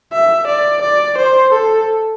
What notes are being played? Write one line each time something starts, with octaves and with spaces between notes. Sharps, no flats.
E5
D5
D5
C5
A4